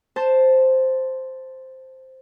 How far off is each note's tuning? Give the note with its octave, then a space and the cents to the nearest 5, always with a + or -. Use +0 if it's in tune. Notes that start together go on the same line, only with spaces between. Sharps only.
C5 +0 A5 +0